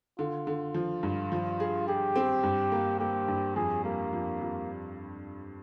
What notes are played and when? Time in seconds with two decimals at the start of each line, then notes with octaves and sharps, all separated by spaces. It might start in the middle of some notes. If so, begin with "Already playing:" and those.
0.19 D3 F4
0.47 D3
0.74 F3
1.03 G2
1.32 F3
1.60 G#4
1.88 G4 G#4
2.16 C4
2.43 G2
2.72 A#3
3.00 A#3 G4
3.28 G2
3.56 F2 G#4
3.85 G3 A#3
4.13 F2
4.41 F2